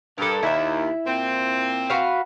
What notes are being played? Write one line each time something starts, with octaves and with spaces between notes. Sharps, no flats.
G2 A4 A#4
D#2 E4 E5
A#2 C4
F#4 B4 F5